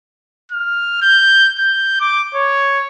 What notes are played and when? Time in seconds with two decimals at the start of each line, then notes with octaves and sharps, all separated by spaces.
0.52 F6
1.02 G6
1.58 G6
2.00 D6
2.35 C#5